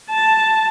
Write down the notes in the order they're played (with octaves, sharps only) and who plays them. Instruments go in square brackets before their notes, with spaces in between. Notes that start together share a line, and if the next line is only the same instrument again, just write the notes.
[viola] A5